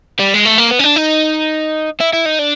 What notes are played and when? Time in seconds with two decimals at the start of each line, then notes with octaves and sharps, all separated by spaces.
0.19 G3
0.34 G#3
0.45 A3
0.58 A#3
0.71 B3
0.79 C#4
0.84 D4
0.96 D#4
2.00 E4
2.13 E4
2.26 D#4
2.39 D4